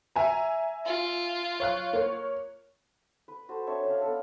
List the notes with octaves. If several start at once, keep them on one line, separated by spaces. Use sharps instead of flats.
E5 G#5 A#5
F4
C#5 F5 F#6
A#3 C#5
B4
F#4 A4 C5
C4 D4 C#5 E5
C#4 D4 F5
B3 A4